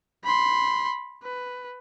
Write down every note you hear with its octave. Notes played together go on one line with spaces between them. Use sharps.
B5 C6
B4